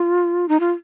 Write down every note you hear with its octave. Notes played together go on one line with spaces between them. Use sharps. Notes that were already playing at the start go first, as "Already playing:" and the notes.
Already playing: F4
D#4
F4